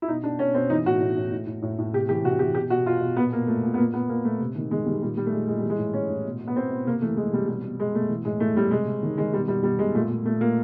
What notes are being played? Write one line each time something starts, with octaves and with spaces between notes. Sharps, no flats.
E4
B2 D#4
B2 D4
B2 C#4
B2 C4
E3 D#4
A2 F#4
A2
A2
A2
A2
A2
A2
C3 G4
E3 G4
C3 F#4
E3 G4
B2 G4
B2 F#4
B2 F4
B2
A#2 B3
A#2 A#3
A#2 A3
A#2
B3
A#2 A#3
A#2 B3
A#2 A#3
A#2 A3
C3
D#3
D#3 G#3
D#3 G3
A#2 G3
A#2 G3
A3
A#2 G#3
A#2 G#3
E3 G3
G#3
A2
E3 C#4
A2
B2
B2
B3
B2 C4
B2
C3 A#3
E3 A3
E3 G#3
C3 G3
B2 G3
B2
B2 G#3
B2 A3
E3
A2 G#3
A2 A3
A2 G3
C3 G#3
C3
D#3
D#3 G#3
B2 G3
B2 G3
B2 G3
B2 G#3
A#2 A3
A#2
A#2 A3
A#2 A#3